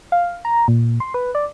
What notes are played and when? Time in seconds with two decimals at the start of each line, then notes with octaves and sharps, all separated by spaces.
0.12 F5
0.45 A#5
0.68 A#2
1.00 C6
1.14 B4
1.35 D5